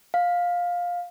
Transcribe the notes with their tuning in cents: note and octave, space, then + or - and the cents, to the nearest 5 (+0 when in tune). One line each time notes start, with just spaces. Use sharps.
F5 +15